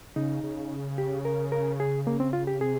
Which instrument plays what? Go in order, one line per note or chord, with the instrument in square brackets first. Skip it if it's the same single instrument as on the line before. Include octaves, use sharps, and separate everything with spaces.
[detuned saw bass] C#3 [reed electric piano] D#4
[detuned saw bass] C#3
[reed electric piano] G4
A#4
A#4
G#4
A#3
C4
F4
G4
[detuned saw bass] C3 [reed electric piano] G#4